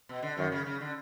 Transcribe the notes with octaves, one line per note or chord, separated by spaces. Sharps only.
B2
D3
F#2 D#3
C#3
C#3
D3